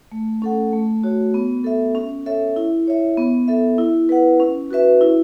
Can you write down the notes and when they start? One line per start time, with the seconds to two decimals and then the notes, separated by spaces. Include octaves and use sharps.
0.12 A3
0.42 C#4 A4 F#5
0.73 A3
1.04 F#4 C#5
1.34 B3
1.64 A4 E5
1.95 C#4
2.26 A4 C#5 E5
2.56 E4
2.88 C#5 E5
3.17 B3
3.48 A4 E5
3.78 E4
4.09 B4 F#5
4.40 C#4
4.71 F#4 B4 E5
5.01 E4